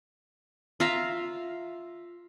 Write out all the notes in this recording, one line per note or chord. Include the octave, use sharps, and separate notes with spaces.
F4 E5 F5 A#5